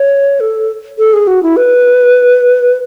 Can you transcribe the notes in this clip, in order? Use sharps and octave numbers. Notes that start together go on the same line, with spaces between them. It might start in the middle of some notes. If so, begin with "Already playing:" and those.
Already playing: C#5
A4
A4
G#4
F#4
E4
B4